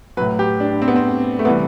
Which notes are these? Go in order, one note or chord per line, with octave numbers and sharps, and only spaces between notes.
A2 F#3 B4
G4
D4
C4
B3
C4
A3
C3 E3 G3 B3